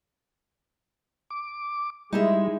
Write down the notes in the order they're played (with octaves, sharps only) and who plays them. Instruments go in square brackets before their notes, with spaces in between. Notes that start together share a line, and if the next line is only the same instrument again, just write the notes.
[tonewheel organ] D6
[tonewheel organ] G3 [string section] G#3 [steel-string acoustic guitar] D#4 E4 E5